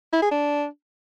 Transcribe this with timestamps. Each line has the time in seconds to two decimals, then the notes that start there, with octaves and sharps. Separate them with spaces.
0.13 E4
0.22 G#4
0.31 D4